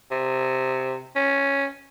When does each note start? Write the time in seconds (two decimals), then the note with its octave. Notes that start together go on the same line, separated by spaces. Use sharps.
0.11 C3
1.16 C#4